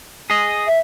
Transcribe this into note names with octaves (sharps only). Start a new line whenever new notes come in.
G#4 D#5
E5